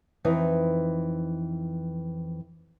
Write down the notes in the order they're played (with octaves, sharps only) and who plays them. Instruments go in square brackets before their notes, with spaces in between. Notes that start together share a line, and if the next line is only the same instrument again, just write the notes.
[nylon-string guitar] F2 E3 D#4 B4